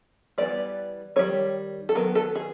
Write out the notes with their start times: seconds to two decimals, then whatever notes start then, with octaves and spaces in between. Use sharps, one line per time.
0.38 E3 G3 B3 D#4 D5
1.16 D#3 G3 C4 D#4 C#5
1.89 A4
1.95 D#3 F#3 B3 A#4
2.15 A4
2.36 G#4